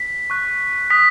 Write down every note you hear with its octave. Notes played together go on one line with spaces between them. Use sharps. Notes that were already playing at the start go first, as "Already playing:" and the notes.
Already playing: B6
C#6 F#6
D#6 F#6 B6